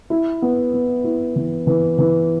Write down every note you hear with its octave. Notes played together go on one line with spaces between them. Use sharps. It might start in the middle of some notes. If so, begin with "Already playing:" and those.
E4
B3
B3
E4
E3
E3
E3